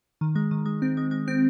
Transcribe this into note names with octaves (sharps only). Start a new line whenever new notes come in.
D#3
G#3
D#3
G#3
C4
G#3
G#3
C4